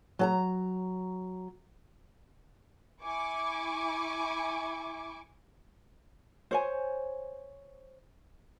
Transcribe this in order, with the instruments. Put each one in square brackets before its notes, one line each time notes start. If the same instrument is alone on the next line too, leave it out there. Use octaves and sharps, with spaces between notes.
[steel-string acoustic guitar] F#3 A5 A#5
[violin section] E4 G#5 C#6 D6
[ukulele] C5 C#5 G#5